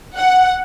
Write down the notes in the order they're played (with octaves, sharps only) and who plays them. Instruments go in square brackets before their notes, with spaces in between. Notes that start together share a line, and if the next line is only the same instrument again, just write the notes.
[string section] F#5